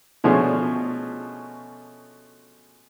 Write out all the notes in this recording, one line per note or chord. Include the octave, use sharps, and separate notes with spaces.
B2 F3 A3 C#4 D4 G#4